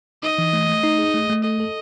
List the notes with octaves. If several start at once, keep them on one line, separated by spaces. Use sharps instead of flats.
D#4 D#5
E3
A3
A3
D#4
G#4
A3
A3
A4 D#5
A4